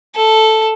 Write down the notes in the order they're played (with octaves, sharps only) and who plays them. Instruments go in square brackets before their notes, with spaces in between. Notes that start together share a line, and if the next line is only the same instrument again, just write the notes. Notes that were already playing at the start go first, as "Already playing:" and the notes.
[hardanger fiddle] A4